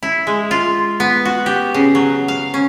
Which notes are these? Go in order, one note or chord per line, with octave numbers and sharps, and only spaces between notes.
E4
G#3
F4
B3
F#4
G4
C#3
F#3
F5
C#4